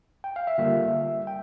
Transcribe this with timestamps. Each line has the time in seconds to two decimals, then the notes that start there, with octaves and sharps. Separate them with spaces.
0.24 G5
0.36 F5
0.47 E5
0.58 D3 G3 A#3 F4 E5
1.27 G5